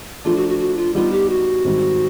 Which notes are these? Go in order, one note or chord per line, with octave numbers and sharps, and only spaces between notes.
F3 A3 D4 F4
F#4
F#4
F#4
F4
G3 B3 D#4 F4
G4
F#4
G#2 D#3 G3 C4 D#4